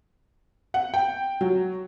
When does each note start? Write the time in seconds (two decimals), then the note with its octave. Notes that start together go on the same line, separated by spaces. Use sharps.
0.74 F#5
0.94 G5
1.41 F#3